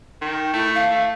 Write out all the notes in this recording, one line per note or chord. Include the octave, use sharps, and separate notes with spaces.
D#3
A3 E4
F5
A3